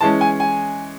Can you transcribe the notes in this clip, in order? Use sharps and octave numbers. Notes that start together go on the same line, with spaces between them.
E3 G#3 C#4 A5
G#5
G#5